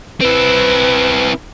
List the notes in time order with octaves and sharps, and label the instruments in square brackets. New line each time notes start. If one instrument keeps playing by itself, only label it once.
[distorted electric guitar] C4 E4 [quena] B4